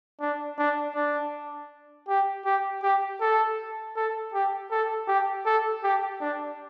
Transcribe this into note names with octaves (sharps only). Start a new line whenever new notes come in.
D4
D4
D4
G4
G4
G4
A4
A4
G4
A4
G4
A4
G4
D4